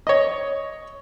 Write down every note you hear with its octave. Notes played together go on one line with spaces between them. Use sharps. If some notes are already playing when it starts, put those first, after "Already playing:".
C#5 D#5